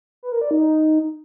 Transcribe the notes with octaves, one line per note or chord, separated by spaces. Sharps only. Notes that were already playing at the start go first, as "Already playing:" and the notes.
B4
A#4
D5
D#4